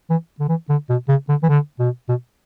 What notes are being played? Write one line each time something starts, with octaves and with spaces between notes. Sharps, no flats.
E3
D3
E3
D3
B2
C#3
D3
E3
D3
B2
B2